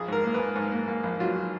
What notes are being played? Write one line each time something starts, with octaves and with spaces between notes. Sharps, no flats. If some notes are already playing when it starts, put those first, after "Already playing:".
Already playing: A#1 G#4
G#2 A#4
A#3
G#2 B4
G#2
A#3
A#3
A#1
F#3 F4
F#3